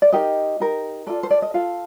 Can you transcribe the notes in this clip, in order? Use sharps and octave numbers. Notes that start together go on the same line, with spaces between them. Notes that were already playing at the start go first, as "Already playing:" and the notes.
D5
D#4 G4 A#4 D#5
D#4 G4 A#4
F4 A4 D5
C5
D5
D#5
F4 A4 F5